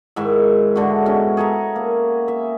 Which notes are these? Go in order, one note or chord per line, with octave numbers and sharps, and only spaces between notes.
G#2 D#3 E4 E5
G#2 D3 E4 F#4
B2 C#4
G#4 A4 E5 A#5
A#3
E5